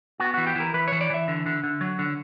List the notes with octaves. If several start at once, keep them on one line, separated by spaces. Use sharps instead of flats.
B3 F#4
E3 F#4
G4
E3 A#4
E3 B4
E3 C#5
D5
E3 E5
D3
D3
D3
F#3
D3